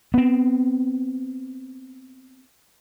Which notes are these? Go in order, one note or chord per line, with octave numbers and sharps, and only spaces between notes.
B3 C4